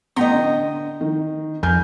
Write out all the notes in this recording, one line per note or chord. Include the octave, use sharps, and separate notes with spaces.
A1 B3 D#5 G5 A#5 C6
D3
D#3
F2 G#5 F6 G6